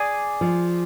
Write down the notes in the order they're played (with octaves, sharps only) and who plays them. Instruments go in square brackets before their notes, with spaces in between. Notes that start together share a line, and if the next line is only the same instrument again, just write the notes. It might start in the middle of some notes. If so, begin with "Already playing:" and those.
Already playing: [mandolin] G#4 D5 G#5
[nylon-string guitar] F3